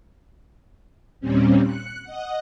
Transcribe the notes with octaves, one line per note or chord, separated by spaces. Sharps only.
D#2 A#2 G3 C4 C#4
F#6 C#7
D#5 F#5